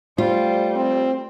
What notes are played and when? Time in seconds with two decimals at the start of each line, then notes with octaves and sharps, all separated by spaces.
0.18 G3 A3 F4 C5
0.76 C4